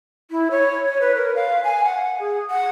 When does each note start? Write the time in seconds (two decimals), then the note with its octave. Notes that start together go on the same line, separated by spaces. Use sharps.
0.31 E4
0.51 C#5
0.86 C#5
1.01 B4
1.15 A#4
1.35 F5
1.64 G#5
1.84 F#5
2.20 G#4
2.50 F#5